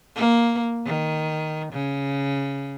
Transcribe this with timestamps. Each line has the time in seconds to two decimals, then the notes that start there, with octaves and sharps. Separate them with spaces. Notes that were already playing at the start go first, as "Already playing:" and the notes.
0.16 A#3
0.86 D#3
1.72 C#3